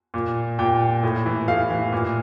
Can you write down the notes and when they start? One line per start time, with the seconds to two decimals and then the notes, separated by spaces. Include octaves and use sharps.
0.14 A#2
0.59 A#2 G5
1.03 A2
1.26 E3
1.48 A2 F5
1.70 E3
1.92 A#2